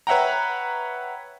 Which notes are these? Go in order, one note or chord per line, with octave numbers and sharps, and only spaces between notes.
B4 C#5 E5 F#5 G5 A#5